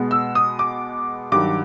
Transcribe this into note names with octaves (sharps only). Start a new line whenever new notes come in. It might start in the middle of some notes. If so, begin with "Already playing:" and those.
Already playing: B2 G#3 B3
E6
D#6
D6
G2 D#3 F#3 D6